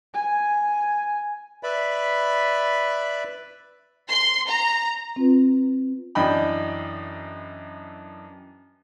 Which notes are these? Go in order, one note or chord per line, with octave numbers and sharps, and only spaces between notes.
G#5
B4 D5 E5 B5
C6
A#5
C4 F4 B4
F#2 E3 D4 D#5 G5 B5